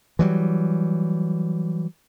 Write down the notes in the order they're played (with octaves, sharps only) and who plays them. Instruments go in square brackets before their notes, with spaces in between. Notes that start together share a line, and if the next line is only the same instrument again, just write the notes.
[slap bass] E3 F#3 G3